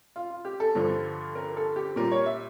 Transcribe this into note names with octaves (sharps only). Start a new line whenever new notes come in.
F4
F4
G4
A4
G2 D3 F3
A#4
A4
G4
A#2 G3 A#4
C#5
E5